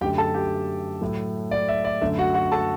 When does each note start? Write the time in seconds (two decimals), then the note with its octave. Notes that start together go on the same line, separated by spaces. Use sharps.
0.01 F#2 D3 A3 G4 G5
0.18 A4 A5
0.34 G4 G5
1.01 A2 F#3 A3
1.51 D5
1.69 E5
1.84 D5
2.01 F#2 D3 F#3 A3 E5
2.18 F#4 F#5
2.34 F#4 F#5
2.52 A4 A5